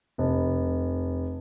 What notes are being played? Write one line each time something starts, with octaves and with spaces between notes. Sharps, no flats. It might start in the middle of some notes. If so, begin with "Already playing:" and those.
F1